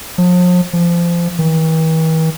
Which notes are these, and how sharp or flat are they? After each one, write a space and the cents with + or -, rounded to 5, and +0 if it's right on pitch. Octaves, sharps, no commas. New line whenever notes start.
F3 +40
F3 -25
E3 -45